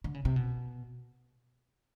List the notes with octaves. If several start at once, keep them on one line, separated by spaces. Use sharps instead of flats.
D3
C#3
C3
B2